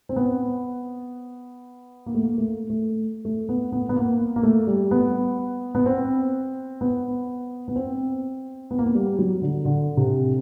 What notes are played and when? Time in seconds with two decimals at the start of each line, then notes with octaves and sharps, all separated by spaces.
0.09 C4
0.16 B3
2.06 A#3
2.15 A3
2.23 A#3
2.38 A3
2.70 A3
3.25 A3
3.49 B3
3.72 B3
3.89 B3
3.96 A#3
4.36 A#3
4.43 A3
4.67 G3
4.91 B3
5.75 B3
5.86 C4
6.81 B3
7.68 B3
7.76 C4
8.71 B3
8.79 A#3
8.86 B3
8.95 G3
9.19 F#3
9.42 D3
9.65 D3
9.97 C3